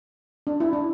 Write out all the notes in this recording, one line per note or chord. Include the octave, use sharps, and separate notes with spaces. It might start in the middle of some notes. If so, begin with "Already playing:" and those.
D4
E4
D4